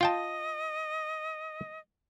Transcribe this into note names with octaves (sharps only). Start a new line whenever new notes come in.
F4 D#5 G5 A5